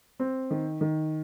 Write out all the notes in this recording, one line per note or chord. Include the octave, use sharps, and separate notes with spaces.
C4
D#3
D#3